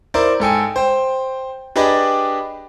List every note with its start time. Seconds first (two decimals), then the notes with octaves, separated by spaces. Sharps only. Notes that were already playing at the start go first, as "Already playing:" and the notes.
0.14 E4 A#4 C5 D5
0.40 G#2 A4 G5 G#5
0.76 C5 G5
1.76 D4 G4 G#4 B4 D5 D#5